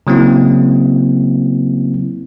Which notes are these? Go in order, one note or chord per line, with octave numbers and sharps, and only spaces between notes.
C#3 F#3 A#3 C4 E4